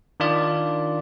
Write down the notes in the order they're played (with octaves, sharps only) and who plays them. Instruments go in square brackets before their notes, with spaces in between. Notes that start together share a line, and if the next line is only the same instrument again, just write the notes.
[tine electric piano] D#3 D4 F4 D5